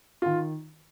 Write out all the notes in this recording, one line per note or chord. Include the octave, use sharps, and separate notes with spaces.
D#3 F4